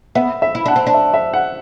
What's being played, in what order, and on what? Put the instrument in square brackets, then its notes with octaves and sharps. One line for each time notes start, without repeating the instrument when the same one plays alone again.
[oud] B3 [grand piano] E5
[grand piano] E5
[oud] E4
[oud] D4 [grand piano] F#5
[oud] C4
D4
[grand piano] E5
E5
F#5